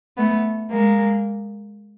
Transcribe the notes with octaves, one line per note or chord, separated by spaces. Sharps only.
A3 B3
G#3 A#3